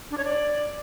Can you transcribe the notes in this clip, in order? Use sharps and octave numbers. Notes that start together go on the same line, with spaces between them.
D4
C#5
D5